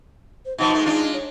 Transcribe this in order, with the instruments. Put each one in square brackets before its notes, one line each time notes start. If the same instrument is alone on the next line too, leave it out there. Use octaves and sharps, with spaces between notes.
[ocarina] C5
[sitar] B2 F3 [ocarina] D#4
[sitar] G#3 A3
G#3 D4 F4
[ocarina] C#5